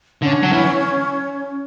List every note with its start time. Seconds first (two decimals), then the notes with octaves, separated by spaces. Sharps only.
0.22 D3 C#4
0.43 F#3
0.52 E3